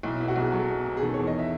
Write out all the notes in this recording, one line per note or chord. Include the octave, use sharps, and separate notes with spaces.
B1 E4
E4
B2
F#4
B1
G#4
F#3 A4
B2
B2
G#4
D#3 A4
C#5
E2
D#5
E5